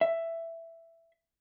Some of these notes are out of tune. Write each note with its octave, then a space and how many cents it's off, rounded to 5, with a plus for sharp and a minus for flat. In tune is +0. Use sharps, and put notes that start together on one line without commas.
E5 +10